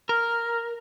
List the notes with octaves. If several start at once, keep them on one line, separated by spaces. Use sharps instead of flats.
A#4 F6